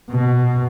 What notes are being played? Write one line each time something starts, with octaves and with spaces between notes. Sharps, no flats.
B2